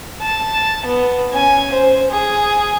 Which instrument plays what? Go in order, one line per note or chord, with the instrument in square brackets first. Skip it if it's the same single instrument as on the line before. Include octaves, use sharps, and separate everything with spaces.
[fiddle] A5
B3
C#4 G#5
C5
G#4